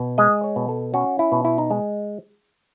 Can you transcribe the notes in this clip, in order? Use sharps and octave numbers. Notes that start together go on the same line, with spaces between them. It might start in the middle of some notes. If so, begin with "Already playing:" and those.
Already playing: B2
G#3 D#5
C#5
B2
A4
C#4 F#4
E4
B2
E4
D#4
G#3